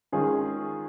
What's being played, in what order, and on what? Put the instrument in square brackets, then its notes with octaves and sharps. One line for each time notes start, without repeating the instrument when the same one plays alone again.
[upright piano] D#3 G#3 C#4 F4 G#4